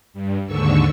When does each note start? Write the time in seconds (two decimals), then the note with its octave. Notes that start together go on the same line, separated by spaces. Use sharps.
0.14 G2
0.47 D#2 G#2 D3 C#6 E6